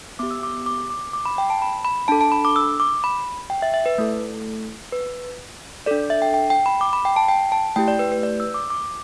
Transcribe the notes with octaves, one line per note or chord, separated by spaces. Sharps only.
B3 G4 D6
E6
D6
D6
D6
D6
B5
G5
A5
B5
B5
D4 A4 A5
A5
B5
D6
E6
D6
B5
G5
E5
E5
B4
A3 E4 A4
B4
D4 A4 D5
E5
G5
G5
G5
B5
D6
B5
G5
A5
G5
A5
A3 E4 G4 G5
D5
B4
B4
D5
E6
D6
D6